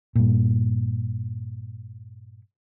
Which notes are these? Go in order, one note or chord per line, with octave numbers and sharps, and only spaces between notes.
G2 A#2